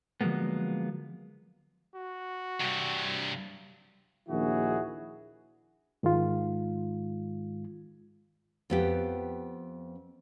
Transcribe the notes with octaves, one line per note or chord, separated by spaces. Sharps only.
D3 F3 F#3 G#3 A#3 B3
F#4
G2 C3
A#1 D#2 D#3 E4 F#4 G#4
G#2 D#3 G#3 F4
F2 B3 G4